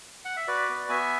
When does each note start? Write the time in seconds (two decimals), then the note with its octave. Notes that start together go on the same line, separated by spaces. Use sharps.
0.25 F#5
0.37 E5
0.48 F#4 B4 D5
0.69 B3
0.89 B3 E5 G#5